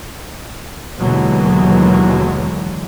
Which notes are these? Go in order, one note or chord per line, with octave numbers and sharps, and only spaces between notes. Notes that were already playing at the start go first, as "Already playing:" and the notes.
D#2 B2 D3 E3 F#3 G#3